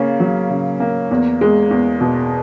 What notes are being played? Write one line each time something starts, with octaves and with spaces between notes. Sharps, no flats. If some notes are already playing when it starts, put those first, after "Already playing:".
Already playing: C#3 A#3 C#4
F#3
C#3
A#3
E2
G#3
E2
B2